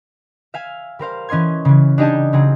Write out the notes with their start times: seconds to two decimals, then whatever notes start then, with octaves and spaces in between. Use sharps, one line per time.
0.54 E5 F5 G#5
0.99 G3 A#4 C5 F5
1.29 E3 C#4 D#5 C6 G#6
1.65 C#3 E3
1.98 D4 D#4 G4 D#5 G#5 A5
2.33 C#3 F#3 C4 G#4